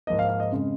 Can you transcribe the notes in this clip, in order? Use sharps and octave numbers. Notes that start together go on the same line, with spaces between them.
G#2 F3 A#3 D#5
F5
F5
D#5
F2 C#3 G#3